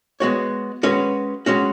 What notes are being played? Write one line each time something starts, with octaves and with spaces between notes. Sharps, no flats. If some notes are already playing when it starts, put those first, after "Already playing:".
G#3 B3 F#4 C#5
G#3 C#4 F#4 B4
G#3 C#4 F#4